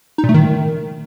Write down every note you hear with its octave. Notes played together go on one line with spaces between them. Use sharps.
D#4
A#2
A3
D#3